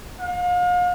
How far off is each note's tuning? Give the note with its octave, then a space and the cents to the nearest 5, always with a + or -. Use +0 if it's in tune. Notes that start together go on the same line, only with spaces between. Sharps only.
F5 +40